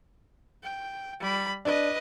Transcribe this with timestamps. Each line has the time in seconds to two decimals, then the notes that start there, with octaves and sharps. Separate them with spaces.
0.63 G5
1.20 G3 B5
1.65 D4 B4 D#5